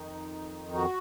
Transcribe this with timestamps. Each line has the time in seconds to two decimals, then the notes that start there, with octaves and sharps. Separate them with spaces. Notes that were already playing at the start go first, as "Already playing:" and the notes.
Already playing: F2 D#3 D#4
0.75 F#4